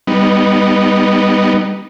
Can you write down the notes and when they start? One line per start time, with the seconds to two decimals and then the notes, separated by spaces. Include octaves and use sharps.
0.07 G3 B3 D#4